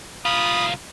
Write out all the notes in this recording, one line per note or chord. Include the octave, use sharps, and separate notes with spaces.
C2 F4 B5 D#6